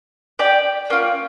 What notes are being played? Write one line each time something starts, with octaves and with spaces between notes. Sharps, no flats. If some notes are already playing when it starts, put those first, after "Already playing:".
G4 D5 G5
A#3 C#4 F4